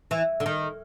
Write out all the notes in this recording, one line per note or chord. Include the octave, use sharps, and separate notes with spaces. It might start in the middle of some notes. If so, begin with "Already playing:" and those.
E3
D3
D#3